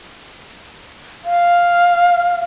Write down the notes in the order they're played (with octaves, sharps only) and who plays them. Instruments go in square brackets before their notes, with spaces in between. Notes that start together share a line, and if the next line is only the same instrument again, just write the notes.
[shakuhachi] F5